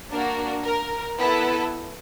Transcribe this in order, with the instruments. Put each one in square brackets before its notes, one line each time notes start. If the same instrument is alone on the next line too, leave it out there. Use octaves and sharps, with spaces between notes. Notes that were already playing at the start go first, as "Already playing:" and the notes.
[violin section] A#3 D4 F#4 A#4
A#4
B3 E4 A4 B4